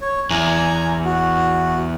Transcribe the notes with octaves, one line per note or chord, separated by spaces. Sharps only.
C#5
E2 G#5 A#5
F#4